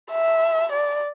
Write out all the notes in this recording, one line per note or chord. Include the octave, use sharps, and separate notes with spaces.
E5
D5